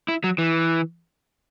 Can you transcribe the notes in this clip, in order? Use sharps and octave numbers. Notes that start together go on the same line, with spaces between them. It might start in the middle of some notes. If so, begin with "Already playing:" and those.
E4
F#3
E3